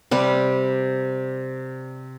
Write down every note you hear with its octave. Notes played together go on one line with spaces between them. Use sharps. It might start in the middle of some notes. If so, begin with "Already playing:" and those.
C3 G3 B4